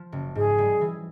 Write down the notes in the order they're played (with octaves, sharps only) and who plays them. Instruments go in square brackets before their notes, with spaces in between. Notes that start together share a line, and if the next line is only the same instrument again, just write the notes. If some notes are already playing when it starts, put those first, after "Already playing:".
Already playing: [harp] F3
F#1
[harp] G#2 [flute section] G#4
[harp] G3
E3